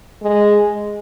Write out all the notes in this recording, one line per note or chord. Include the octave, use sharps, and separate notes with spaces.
G#3